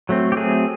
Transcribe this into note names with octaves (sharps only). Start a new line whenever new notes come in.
F#3 A3 C4
G4
F#3 A3 C4 G#4